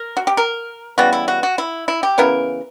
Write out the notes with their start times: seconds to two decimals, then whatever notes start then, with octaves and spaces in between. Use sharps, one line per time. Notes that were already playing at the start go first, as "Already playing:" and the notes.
Already playing: A#4
0.17 F#4
0.27 G4
0.37 A#4
0.98 C#3 E3 G3 B3 F#4
1.13 E4
1.28 F#4
1.43 F#4
1.58 E4
1.88 E4
2.03 G4
2.18 C#3 E3 B3 E4 A#4